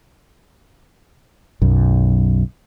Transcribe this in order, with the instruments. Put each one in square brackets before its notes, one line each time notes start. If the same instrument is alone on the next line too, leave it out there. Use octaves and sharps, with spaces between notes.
[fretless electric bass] B1 F#2